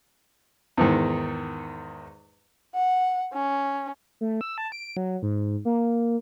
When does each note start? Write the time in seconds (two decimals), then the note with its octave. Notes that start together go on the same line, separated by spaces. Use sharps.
0.77 E2 G#2 D#3
2.74 F#5
3.33 C#4
4.21 A3
4.41 E6
4.58 A5
4.72 D7
4.97 F#3
5.22 G#2
5.65 A#3